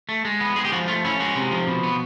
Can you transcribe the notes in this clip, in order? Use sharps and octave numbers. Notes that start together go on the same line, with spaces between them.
A3
G#3
B3
G#3 G#4
G4
F3 F#4
A3 F4
C#4 E4
G#3 F#4
C3
F3
B2
B3